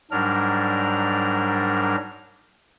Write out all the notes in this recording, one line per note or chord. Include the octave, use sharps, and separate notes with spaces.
G#2 F#3 G3 D4 A#4 F6